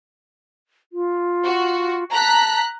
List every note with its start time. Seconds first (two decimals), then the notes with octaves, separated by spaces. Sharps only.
0.93 F4
1.45 F#4
2.13 A5 A#5 F#6 B6